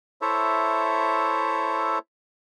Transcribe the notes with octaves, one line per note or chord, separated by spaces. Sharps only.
E4 A4 C5 C#5 E5